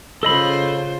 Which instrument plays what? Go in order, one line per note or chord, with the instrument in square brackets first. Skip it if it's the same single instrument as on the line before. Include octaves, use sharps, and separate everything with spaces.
[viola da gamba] C#3 F4 C5 [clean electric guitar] A4 D#5 B5